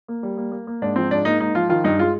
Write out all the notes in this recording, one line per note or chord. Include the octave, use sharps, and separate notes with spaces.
A#3
G3
A#3
A#3
A#3
G#2 D4
F3 C4
G#2 D4
A#3 D#4
G#2 D#4
F3 F4
D#3 F4
G2 D#4
G#3 F4